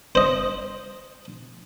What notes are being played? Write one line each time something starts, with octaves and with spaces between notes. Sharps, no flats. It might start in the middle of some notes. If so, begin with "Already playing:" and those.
C5 D#5